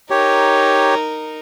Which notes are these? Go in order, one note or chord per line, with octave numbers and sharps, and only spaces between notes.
D#4 G4 A#4 C#5